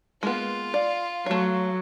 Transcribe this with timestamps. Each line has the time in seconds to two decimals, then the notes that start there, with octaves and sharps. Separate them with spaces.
0.23 G#3 A#3 B3 F4
0.74 D5 F5
1.26 F#3 A3 C#5